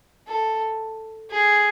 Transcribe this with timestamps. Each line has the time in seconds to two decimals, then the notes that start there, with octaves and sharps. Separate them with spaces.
0.27 A4
1.31 G#4